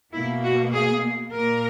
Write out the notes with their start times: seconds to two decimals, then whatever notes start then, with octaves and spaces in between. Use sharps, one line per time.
0.14 B2 A#3 E4
0.44 F#4
0.72 G#4
1.32 A#2 A#3 A#4